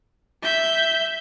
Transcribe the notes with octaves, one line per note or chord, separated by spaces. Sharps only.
E5 G6